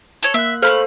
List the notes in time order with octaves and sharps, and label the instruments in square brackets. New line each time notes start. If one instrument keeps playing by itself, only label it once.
[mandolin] A4 C#5
[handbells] A#3 F#6 [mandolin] E5
[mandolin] A3 B5 F6 [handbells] A4 C5 F5